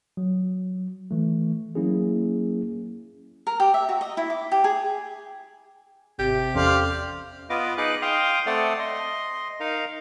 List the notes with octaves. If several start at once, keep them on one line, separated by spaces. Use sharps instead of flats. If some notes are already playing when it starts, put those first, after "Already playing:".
F#3
E3 A3
F#3 A#3 C#4 E4 G#4
A#4
G4
E5
F#4
D#5
E4
D6
G4
G#4
G#1 C3 G4
E2 C#4 A4 C5 D5 F5
B3 F4 B4 D#5 D6
D#4 G#4 B4 D6 F#6
F5 G5 C6 D#6
A3 C4 A4 D5 F#5 D#6
D#5 C6
D#4 A#4 F5